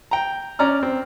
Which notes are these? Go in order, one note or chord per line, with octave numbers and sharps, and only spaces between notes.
G5 A#5
C#4 D5 A#5 F6
C4